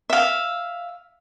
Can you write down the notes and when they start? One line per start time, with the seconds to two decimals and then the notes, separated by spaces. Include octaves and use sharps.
0.10 E5 F5